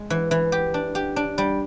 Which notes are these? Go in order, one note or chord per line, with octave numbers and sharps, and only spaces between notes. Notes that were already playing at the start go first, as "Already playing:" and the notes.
Already playing: G#3
E3
E3
G4
D4
G4
D4
G3